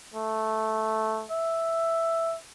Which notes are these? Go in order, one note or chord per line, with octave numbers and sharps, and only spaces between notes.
A3
E5